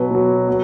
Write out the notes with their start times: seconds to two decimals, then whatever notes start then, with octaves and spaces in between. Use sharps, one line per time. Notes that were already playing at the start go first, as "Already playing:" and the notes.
Already playing: B2 F#3 B4
0.11 B2 F#3
0.48 F#3